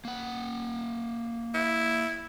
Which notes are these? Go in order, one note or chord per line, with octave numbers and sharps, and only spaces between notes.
A#3 F#5
E4